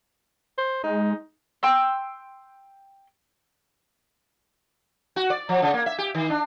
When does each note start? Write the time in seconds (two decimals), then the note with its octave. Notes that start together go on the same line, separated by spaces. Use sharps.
0.58 C5
0.83 G#3 D#4
1.63 G5 C6 E6
5.16 F#4
5.30 D5
5.49 F3
5.62 C#3
5.74 A#3
5.86 E5
5.98 G4
6.15 D#3
6.30 D4